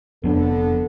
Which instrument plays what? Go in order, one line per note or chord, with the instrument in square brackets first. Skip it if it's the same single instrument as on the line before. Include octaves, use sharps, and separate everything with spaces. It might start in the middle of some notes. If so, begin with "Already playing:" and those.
[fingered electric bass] F1 F2 D4 [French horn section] D3 B3 A4